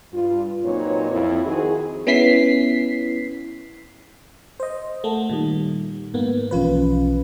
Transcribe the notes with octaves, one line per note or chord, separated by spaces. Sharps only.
G2 F4
A#2 F#3 C4 D#4 B4 C#5
F2 E4
D#3 C4 D#4 F#4 G#4
B3 C#4 E4 B6 C7
C5 D#5
A3 A#4 F#5 A5
A#2 D#3 G3 D#4
G#2 A#3 B3
B1 E3 F3 C#4 F4 B4